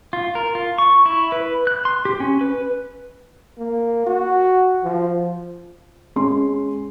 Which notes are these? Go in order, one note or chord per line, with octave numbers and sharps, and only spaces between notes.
F4
A#4
F4
C#6
E4
B4
F#6
C6
G4
C#4
B4
A#3
F#4
F3
G#3 C#4 C6